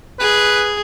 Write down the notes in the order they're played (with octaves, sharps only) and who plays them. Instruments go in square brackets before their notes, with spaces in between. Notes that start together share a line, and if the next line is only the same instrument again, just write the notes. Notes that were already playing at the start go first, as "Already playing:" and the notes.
[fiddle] G#4 [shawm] B4